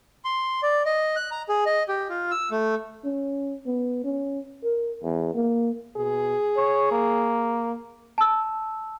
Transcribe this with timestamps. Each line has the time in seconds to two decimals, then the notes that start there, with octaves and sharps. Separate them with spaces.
0.24 C6
0.63 D5
0.86 D#5
1.16 F#6
1.31 A#5
1.49 G#4
1.66 D#5
1.88 G4
2.09 F4
2.31 E6
2.51 A3
3.04 C#4
3.66 B3
4.04 C#4
4.63 A#4
5.03 E2
5.34 A#3
5.97 B2 G#4
6.57 C#5
6.92 A#3
8.18 A5 E6